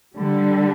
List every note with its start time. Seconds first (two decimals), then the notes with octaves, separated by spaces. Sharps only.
0.16 D3 G3